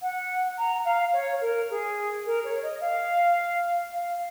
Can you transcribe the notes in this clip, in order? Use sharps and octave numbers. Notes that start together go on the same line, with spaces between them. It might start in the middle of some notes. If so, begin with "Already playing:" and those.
F#5
A#5
F5
C#5
A#4
G#4
A#4
C#5
D#5
F5
F5